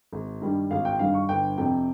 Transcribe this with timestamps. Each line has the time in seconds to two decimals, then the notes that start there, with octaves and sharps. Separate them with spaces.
0.13 G#1
0.41 G2 D#3 G3
0.71 G#1 F5
0.85 G5
0.99 G2 D#3 G3 F5
1.14 C#6
1.29 G1 G5
1.58 F2 C3 G5